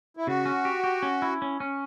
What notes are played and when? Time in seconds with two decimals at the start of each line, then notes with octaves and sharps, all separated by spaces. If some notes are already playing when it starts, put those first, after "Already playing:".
0.17 E4
0.27 C#3 F#4
0.46 C#4
0.65 G4
0.84 G4
1.03 C#4
1.22 E4
1.42 C#4
1.60 C#4